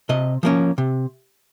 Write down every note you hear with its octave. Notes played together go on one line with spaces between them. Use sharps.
C3 D#5
F3 A#3 C#4
C3